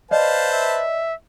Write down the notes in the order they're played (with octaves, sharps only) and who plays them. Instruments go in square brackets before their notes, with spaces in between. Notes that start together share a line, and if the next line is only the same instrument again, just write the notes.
[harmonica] B4 C5 A5 [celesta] D5 D#5 [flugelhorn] F5
[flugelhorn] E5